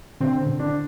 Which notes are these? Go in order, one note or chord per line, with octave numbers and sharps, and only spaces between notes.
D3 C4
D3
D4